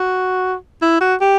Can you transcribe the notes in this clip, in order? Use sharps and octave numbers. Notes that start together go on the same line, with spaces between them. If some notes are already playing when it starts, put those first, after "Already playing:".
Already playing: F#4
E4
F#4
G4